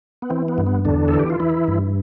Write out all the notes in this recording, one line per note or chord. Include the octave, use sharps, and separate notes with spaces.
B3
E3 C4
B3
G2
B3
E2 D3 D4
E3 A4
G4
F4
E3 E4
G2